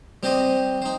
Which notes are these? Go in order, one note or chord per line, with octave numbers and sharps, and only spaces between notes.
G3 C4 G4 C5 D#5
D#4 C5